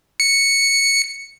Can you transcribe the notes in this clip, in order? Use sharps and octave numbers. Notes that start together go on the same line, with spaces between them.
C#7